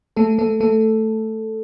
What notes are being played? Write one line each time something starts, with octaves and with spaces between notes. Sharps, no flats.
A3 A4
A3 A4
A3 A4